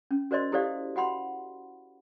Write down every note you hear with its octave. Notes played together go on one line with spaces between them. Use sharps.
C#4
F#4 A#4 C5 D5 D#5 C6
E4 G4 A4 C5 D5 F5
F#4 F#5 B5 C6